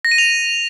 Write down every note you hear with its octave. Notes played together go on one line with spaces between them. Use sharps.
A#6
D#7
F7